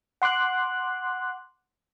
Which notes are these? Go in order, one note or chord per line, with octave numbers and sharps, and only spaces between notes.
F#5 C6 D6 F#6